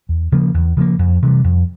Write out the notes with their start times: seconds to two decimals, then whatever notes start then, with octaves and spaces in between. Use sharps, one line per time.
0.09 E2
0.32 C#3 F3 A#3
0.54 E2
0.77 C#3 F3 A#3
0.99 F2
1.22 C3 E3 G3
1.44 F2